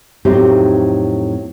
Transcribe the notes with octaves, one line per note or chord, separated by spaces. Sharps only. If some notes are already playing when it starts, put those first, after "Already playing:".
F2 A2 F#3 C4 D#4 G4